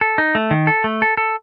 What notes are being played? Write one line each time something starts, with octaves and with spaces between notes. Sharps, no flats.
A4
D#4
A3
D#3
A4
A3
A4
A4